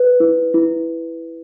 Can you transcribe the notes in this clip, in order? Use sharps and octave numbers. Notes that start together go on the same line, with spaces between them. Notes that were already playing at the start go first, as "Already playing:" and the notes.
Already playing: B4
E4
E4